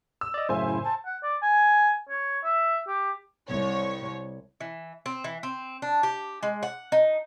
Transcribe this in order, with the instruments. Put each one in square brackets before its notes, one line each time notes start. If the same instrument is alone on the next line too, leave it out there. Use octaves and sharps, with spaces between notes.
[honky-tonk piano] E6
[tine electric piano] D5 D#5
[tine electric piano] F#2 A2 C#3 [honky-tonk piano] C5 G#5 [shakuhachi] E5
[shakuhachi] E4
A5
[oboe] F#5
D5
G#5
C#5
E5
G4
[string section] C2 C#5
[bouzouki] E3
C4
E3
C4
D4
G4
G#3
F#5
D#4